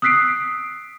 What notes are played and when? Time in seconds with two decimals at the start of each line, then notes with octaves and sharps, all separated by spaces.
0.02 D#6 E6 F#6 B6 C7 D7